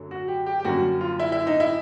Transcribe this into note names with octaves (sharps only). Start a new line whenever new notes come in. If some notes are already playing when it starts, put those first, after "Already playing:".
Already playing: F#2 D3 F#3 A3
F#4
G4
G4
G4
F#2 D3 G3 A#3 F#4
F4
E4
E4
D#4
E4